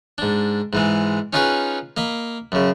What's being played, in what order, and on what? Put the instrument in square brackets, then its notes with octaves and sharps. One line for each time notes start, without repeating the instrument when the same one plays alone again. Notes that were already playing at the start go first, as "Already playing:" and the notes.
[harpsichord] G#2 D4
G#2 E3 G#3
C#4 D#4 F4 F#4 G#4 B4
A#3 D#5 B5
F#2 C#3